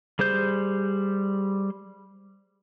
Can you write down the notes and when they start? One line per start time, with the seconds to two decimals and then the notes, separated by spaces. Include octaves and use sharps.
0.19 G3 G#4 C5 G6